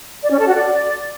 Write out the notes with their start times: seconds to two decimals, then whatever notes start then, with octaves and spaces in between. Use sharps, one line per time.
0.22 D5
0.30 C#4
0.38 A4
0.47 F#4
0.55 D5